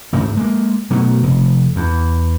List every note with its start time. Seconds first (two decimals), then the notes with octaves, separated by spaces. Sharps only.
0.13 A1 D2 G#2
0.37 G#3 A#3
0.90 B2 F#3 A3
1.23 F1
1.76 E2